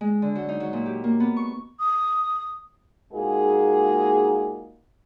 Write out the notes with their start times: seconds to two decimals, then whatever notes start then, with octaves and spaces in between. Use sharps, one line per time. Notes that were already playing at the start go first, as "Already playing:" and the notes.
0.01 G#3
0.22 D3
0.35 F#3
0.49 D#4
0.60 F#3
0.73 A#2
0.86 G4
1.04 A#3
1.20 B3
1.37 C#6
1.80 D#6
3.13 A#2 G#3 A#3 D#4 F#4 G#4